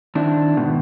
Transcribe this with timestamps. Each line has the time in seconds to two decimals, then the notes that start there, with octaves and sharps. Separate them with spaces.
0.15 D#3 C4 D4 E4
0.57 G#2 B2 D#3